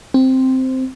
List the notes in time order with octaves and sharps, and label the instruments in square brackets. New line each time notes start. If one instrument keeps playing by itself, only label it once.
[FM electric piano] C4